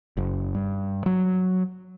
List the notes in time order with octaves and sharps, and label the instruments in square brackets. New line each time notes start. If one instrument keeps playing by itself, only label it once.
[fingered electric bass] F#1
G2
F#3